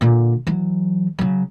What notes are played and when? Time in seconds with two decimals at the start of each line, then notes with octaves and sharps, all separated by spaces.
0.01 A#2 D3
0.47 E3 F#3
1.19 C#3 F#3